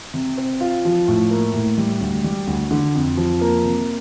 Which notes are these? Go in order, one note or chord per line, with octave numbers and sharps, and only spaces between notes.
C3
C4
F4
F3
A2
A#3
A2
G3
D2
G3
D2
D3
F2
F3
A#3
C3